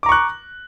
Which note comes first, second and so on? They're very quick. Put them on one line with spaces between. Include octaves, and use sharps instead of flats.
D6 A#5 C#6 F#6